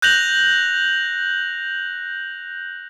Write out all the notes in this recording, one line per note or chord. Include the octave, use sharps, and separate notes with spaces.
F#6 G6 A#6 F7 F#7